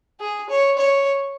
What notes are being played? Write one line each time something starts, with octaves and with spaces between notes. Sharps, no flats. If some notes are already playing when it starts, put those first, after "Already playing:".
G#4
C#5
C#5